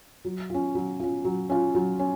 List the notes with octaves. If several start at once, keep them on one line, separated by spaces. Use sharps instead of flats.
F#3
C#4 F4
F#3
C#4 F4
F#3
C#4 F4
F#3
C#4